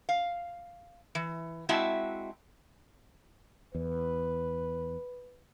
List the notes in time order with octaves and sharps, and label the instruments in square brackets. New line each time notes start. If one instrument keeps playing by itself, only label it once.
[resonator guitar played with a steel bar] F5
E3
G#3 C4 E4 F#4 E5 A5
[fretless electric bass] E2 [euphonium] B4